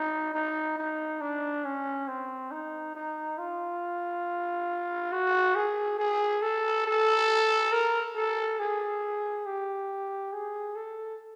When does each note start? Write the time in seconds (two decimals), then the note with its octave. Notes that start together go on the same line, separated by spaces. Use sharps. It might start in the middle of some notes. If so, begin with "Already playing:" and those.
Already playing: D#4
0.34 D#4
0.78 D#4
1.21 D4
1.65 C#4
2.08 C4
2.51 D#4
2.95 D#4
3.38 F4
5.12 F#4
5.55 G#4
5.99 G#4
6.42 A4
6.86 A4
7.72 A#4
8.16 A4
8.60 G#4
9.46 G4
10.33 G#4
10.76 A4